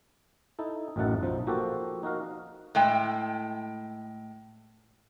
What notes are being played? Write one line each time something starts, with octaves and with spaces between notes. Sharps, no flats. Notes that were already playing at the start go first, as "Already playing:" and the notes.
D#4 E4 A4
A1 F#2 A2 D#4 F#5 A5
B1 F3 D#4
F3 A#3 F#4 G4 A4
D#4 F#4 A#4 F5
A2 G#3 G5